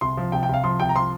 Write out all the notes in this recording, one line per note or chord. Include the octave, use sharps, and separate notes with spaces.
C2 C6
F3
C2 G5
G5
C2 F5
F3 C6
C2 G5
A#5
F3 C6